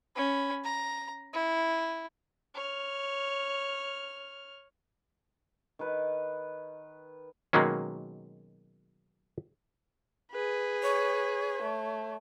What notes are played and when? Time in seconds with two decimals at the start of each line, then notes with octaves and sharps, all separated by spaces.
0.16 C#4 B5
0.64 A#5
1.34 E4
2.54 C#5 F6
5.79 D#3 B4
7.53 B2 D#3 F#3 G#3 A#3 C#4
10.31 G#4 B4
10.83 C#5
11.62 A3